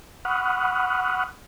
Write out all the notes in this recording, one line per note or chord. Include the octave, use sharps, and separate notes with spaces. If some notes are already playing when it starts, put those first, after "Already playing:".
F#5 B5 C#6 D#6 F6 F#6